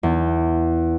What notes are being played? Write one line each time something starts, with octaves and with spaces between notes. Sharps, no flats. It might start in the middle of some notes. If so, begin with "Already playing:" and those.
E2